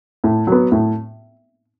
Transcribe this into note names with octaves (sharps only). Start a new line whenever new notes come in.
A2
F#3 B3
A2